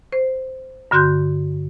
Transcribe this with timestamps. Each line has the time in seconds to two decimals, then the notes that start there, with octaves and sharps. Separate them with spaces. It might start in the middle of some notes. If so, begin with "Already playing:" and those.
0.12 C5
0.91 G2 D3 F#4 C6 F#6 G6